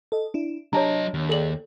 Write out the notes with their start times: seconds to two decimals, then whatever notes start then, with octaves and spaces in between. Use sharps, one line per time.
0.12 A4 D#5
0.34 D4 E4
0.73 F#3 D4 G4 C#5 D#5 A5 A#5
1.14 D#2
1.29 G#4 A4 D5 F#7